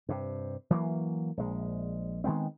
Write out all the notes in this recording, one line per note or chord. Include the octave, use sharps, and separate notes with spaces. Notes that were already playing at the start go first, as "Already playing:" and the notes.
G2 C3
E3 F#3 A#3
A#1 G#3
D#3 G#3 B3 C4